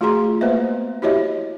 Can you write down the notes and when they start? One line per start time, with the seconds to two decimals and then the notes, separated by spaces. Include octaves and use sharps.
0.01 A3 F4 F#4 G#4 A#5 C6
0.41 A#3 B3 B4 C5 D#5 E5
1.02 E4 F#4 G4 C#5 D#5 E5